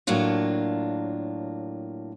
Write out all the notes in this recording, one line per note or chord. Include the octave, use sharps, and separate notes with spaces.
A2 F#3 A#3 D4 F4